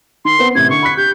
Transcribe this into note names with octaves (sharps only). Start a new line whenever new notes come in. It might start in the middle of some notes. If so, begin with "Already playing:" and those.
D#3 C6
B3 C4
A1 C3 G#6
D3 C#6
B5 F#6 B6
G4 G6